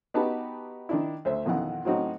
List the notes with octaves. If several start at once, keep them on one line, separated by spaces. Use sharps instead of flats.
B3 D#4 F#4 G4 B4 A5
D#3 D4 E4
D2 C5 E5
B1 F2 D#3 E3 F#5
A2 F#3 C4 D#4 F#4